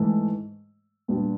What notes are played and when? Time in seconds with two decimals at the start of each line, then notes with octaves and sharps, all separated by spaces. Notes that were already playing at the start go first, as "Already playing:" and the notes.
Already playing: G#2 E3 A3
1.08 A#2 G3 B3 D4 G4